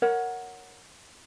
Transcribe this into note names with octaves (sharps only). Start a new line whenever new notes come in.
A#4 C#5 F#5